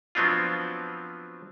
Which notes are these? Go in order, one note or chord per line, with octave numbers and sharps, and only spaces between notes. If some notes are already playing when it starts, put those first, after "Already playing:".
F3 F#3 B3 C4 D4 F4